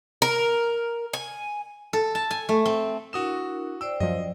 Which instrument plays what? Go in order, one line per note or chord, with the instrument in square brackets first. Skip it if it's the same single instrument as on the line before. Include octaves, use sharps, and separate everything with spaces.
[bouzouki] A#4
G#5
[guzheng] A4
A5
G#5
A3
C4
[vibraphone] D4 E4 A#4 [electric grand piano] F#4 D#6 E7
[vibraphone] C5 D5 G5 [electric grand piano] E6
[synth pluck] F#2 F3 [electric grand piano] D#5